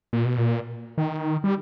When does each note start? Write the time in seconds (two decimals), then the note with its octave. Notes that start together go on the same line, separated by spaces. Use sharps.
0.13 A#2
0.25 B2
0.38 A#2
0.98 D#3
1.44 G3